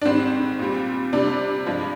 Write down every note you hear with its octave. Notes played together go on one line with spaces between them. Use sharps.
D4
G#2 D#3 G3 C4
A#2 G3
C3 G3 D4
G2 F3 G#3